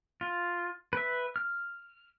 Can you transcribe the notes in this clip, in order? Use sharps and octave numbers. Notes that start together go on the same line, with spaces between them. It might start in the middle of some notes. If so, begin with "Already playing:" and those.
F4
B4 E5
F6